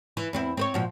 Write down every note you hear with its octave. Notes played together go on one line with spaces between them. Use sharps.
E3
E2 C4 E4
C4 B4 C#5
A#2 F3 F#4